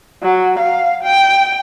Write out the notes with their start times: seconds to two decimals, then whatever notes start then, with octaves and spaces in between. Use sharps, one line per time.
0.22 F#3
0.59 F5
1.03 G5